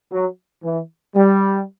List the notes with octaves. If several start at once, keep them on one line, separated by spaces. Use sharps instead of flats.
F#3
E3
G3